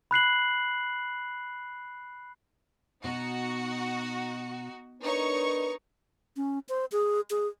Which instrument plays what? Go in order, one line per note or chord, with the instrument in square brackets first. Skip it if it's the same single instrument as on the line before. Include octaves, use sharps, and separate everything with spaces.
[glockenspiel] B5 F#6 C7 F#7
[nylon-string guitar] B2 [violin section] D#4 F#4
[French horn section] D4 A#4 B4 [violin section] D#4 C#5 C#6
[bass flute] C#4
C5
G#4
G#4